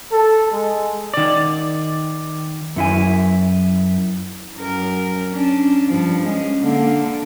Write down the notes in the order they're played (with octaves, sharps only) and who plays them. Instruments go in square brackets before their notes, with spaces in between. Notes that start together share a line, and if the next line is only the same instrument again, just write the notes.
[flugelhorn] A4
G#3
[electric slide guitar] D#3 D5
F#2 E4 G#5
[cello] F#2 A#4
C#4 D4
G2 F3
G#3 C#4
D3 A#3